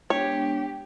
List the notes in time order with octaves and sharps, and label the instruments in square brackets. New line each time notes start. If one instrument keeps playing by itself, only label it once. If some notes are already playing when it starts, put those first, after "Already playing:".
[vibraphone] G#3 B3 D4 [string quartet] G4 [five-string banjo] C#5